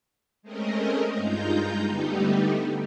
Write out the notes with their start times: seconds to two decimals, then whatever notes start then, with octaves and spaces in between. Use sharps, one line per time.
0.42 G#3 A3 C4 C#4 A#4 D#5
1.12 G2 G#3 D#4 F4 A#5 G6
1.85 D3 G3 A3 B3 D#4 G4